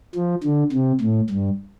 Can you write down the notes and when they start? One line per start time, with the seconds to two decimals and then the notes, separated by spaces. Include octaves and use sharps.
0.15 F3
0.44 D3
0.72 C3
1.01 A2
1.29 G2